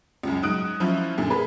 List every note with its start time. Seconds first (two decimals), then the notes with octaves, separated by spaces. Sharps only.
0.23 C#2 F#2
0.42 G#2 F#3 D#6 F#6 D7
0.80 F3 F#3 C#4 E4 F4
1.18 F#2 A#2 D3
1.30 A#3 G#4 B4